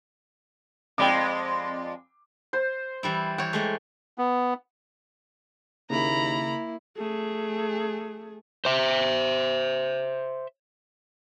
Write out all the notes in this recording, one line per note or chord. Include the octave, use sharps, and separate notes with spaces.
F2 G#3 D5 G5 B5 D6
C5
E3 G3 E4
E3 C#5 G5
E3 G#3 A3
B3
D#2 C#3 A#3 E4 A#5 B5
A3 G#4
C5 E5